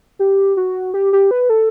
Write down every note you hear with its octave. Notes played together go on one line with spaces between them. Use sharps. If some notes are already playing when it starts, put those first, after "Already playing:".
G4
F#4
G4
G4
B4
A4